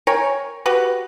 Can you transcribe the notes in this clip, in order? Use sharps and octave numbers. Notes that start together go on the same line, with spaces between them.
A#4 C#5 G5 G#5
F#4 G4 B4